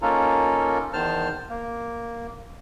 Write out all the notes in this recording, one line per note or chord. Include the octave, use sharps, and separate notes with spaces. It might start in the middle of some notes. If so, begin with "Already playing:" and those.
A#3 C#4 D#4 F4 A4 A#4
E2 D#3 C5 A5 F6
A#3